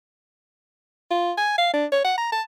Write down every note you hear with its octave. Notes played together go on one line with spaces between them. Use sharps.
F4
G#5
F5
D4
C#5
F#5
A#5
A5